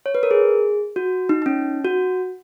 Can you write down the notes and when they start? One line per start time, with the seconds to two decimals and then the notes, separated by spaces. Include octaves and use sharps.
0.06 C#5
0.15 B4
0.23 A#4
0.31 G#4
0.96 F#4
1.29 D#4
1.42 D#4
1.46 C#4
1.85 F#4